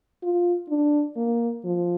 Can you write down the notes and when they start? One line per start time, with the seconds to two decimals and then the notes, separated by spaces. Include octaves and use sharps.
0.23 F4
0.69 D4
1.16 A#3
1.64 F3